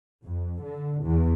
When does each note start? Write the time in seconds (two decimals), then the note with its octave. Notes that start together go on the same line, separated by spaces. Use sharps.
0.24 F2
0.63 D3
1.05 E2